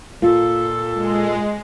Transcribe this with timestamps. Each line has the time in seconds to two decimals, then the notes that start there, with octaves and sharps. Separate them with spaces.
0.22 A#2 F4 A4
0.93 G#3